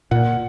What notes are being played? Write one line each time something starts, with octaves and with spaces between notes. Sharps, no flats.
A#2 F#5